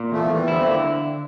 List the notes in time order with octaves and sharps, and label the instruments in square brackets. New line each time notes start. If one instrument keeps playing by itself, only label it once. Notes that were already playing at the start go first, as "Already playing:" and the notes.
Already playing: [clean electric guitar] A#2
[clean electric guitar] E2 [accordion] F3 A3
[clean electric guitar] E2 [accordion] E3 G3
[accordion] D3 F3 [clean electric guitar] E4
[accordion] A3 C4
[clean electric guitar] D3 [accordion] G3 A#3